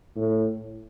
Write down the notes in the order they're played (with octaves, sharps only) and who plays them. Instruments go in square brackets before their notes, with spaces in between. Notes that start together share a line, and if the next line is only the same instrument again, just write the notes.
[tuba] A2